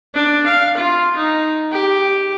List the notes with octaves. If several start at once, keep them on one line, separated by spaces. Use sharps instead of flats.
D4
F5
F4
D#4
G4